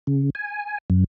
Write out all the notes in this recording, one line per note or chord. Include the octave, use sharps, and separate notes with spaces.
C#3
G#5
F#2